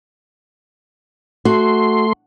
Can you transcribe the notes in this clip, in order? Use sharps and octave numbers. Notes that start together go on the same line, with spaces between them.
A3 F#4 C6